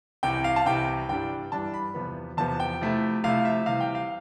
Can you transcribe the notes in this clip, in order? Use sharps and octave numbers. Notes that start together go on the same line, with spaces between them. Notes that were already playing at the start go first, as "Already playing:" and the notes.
C2 C3 E3 G5
F5
A5
C2 C3 E3 G5
G2 E3 G3 D4 G5
G2 E3 G3 D4 A5
B5
E2 C3 F3 B3
E2 C3 F3 B3 A5
G5
C3 F3 A3 E4
C3 F3 A3 E4 F5
E5
C3 E3 G3 F5
G5
F5